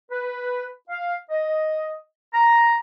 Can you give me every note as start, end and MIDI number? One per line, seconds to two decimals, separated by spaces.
0.11 0.67 71
0.89 1.15 77
1.31 1.96 75
2.33 2.76 82